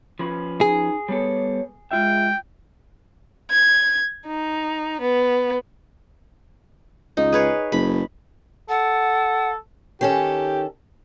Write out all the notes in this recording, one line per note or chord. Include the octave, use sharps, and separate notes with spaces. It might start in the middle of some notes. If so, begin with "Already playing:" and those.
F3 C#4 B4
D#4 G#4
G3 B3 A4 C#5
G#3 F4 E5 G5
G#6
D#4
B3
C#2 D#4
G#4 B4 C#5
F#1 B5
A4 F#5
D#3 C#4 G4 A4